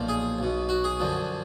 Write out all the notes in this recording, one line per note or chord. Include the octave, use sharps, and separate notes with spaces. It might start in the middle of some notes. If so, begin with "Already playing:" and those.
Already playing: B1 A#2 F3
G#4
B1 B2
F#4
G#4
F#2 D3 F3